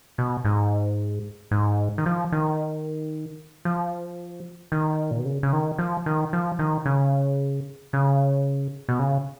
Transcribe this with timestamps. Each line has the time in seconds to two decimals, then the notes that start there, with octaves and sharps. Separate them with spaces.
0.18 B2
0.45 G#2
1.51 G#2
1.98 D#3
2.06 F3
2.32 D#3
3.65 F3
4.72 D#3
5.11 A#2
5.18 B2
5.25 C#3
5.43 C#3
5.53 D#3
5.78 F3
6.06 D#3
6.33 F3
6.59 D#3
6.86 C#3
7.93 C#3
8.89 B2
8.99 C#3